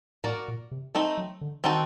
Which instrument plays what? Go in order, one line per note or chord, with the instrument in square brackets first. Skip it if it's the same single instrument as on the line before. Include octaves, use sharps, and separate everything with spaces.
[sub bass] A2 [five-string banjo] A#3 F#4 A#4 D5
[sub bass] A#2
C3
[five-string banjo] A3 C4 D#4
[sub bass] F#3
D3
[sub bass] D#3 [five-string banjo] C4 D#4 F#4 A4